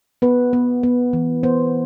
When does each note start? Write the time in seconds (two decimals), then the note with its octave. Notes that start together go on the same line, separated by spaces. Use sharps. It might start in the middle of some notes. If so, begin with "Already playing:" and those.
0.22 B3 B4
0.53 B3
0.83 B3
1.13 E3
1.43 B3 C5